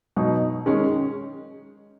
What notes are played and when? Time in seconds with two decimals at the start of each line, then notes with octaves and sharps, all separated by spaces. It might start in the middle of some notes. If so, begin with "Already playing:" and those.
0.17 B2 F#3 D#4
0.66 D#3 G#3 C#4